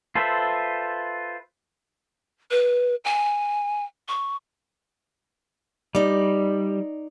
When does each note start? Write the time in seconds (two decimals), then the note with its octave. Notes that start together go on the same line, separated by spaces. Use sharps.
0.15 F4 A4 B4 C5 E5
2.51 B4
3.05 G#5
4.08 C#6
5.95 G3 D#4 D5